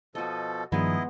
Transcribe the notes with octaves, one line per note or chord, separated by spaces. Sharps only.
B2 F3 F#4 A4 D#5
G2 D#3 F3 G#3 B3 E4 G#4 D#5